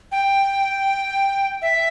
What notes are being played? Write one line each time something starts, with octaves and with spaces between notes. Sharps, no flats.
G5
E5